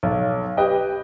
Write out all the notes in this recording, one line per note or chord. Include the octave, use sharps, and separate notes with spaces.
B1
G4 B4 D#5 G5